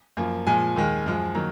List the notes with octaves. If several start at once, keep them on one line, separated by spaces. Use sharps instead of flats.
F#2 F3 A#3
A#2 F3 G#3 G#5
D#2 D#3 G#3
F#2 F3 G#3
D#3 F#3 A#3 A#5